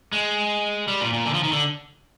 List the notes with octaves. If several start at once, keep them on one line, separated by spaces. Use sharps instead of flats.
G#3
G3
A#2
A#2
D3
F3
D#3
D3